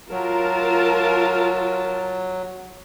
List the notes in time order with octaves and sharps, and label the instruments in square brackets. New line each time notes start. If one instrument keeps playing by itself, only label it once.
[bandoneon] F#3 [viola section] F4 A#4 A5